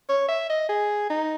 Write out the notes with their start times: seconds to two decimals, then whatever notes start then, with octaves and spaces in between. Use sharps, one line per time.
0.09 C#5
0.29 E5
0.50 D#5
0.69 G#4
1.10 D#4